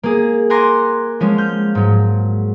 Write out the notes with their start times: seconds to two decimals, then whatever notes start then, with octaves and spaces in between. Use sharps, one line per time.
0.03 A#3 G#4
0.50 F#5 G#5 A#5 C6 D6 A#6
1.20 F3 G#3 C#4
1.38 F6 G6
1.75 G#2 F#3